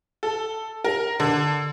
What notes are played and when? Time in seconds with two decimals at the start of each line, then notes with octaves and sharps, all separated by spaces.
0.23 A4
0.84 A#4
1.20 D3